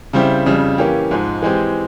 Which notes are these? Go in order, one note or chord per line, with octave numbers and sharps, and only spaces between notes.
C#3 G3 C4 E4 G4
F2 C#3 G3
E3 A#3 C#4 G4
G#2 F3 G#3
E3 G#3 C4 G4